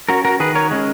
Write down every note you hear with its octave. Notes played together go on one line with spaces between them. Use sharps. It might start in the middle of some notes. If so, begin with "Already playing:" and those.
C#4 F#4 A#4
F#4 A#4
D#3 G#4 B4
A#4 C#5
G#3 C#4